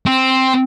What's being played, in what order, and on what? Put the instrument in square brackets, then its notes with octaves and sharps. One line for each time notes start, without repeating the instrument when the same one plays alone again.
[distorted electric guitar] C4